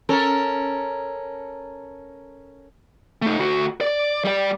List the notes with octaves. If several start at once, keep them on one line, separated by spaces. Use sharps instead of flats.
C#4 A4 A#4
A3 D#4
D2 F#4
D5
G3 D5